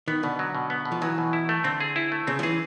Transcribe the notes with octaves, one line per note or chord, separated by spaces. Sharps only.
D#3 B3
B2 D3
F#3
B2
B3
B2
F3
E3 F#3
B2
E4
A3
D3 C4
G#4
E4
A3
C#3 C4
F3
E3 G#4